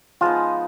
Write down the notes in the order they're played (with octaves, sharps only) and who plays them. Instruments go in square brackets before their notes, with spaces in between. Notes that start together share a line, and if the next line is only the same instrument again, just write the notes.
[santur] F3 G#3 B3 D#4 [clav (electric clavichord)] F4